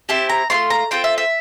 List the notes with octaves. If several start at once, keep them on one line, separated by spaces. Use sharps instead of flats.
C4 E4 G4 A5
A#5
A3 C4 F4 C6
A#5
C4 F4 A4 G5
E5
E5